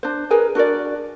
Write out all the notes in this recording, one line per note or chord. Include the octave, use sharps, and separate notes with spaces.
D4 C5
G#4 A#4 B4 G#5
D4 F#4 A#4 D5